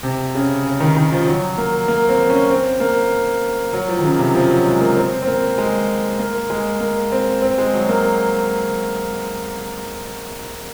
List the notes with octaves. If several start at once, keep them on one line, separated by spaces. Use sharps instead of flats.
C3
C#3
C#3
D#3
D#3
F3
F#3
A#3
A#3
C4
C#4
C4
A#3
F#3
F3
D#3
C#3
C3
F3
F#3
G#3
A#3
C4
C4
A#3
G#3
A#3
G#3
A#3
C4
C4
G#3
F#3
A#3